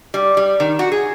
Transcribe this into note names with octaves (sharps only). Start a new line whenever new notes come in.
G3
G3
D#3
F#4
G#4